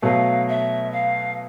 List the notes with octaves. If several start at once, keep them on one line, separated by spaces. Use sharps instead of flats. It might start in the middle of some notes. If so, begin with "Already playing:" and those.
B2 F#3 A3 F5
E5
F5